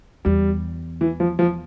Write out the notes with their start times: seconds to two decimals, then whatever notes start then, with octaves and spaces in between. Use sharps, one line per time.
0.25 E2 G3
1.01 E3
1.20 F3
1.39 F3